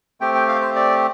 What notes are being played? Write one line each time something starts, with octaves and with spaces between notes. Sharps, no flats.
A3 C4 G4 G5
G5
F5
C5
D5